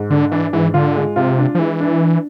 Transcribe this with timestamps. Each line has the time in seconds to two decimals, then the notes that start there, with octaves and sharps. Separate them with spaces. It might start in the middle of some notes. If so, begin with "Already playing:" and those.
Already playing: G#2
0.10 D3 D4
0.32 E3 D4
0.53 G#2 E3
0.74 D3 F4
0.96 G#3
1.16 C3 F4
1.38 D4
1.55 F3
1.59 E3 G#3
1.80 D4
2.01 D4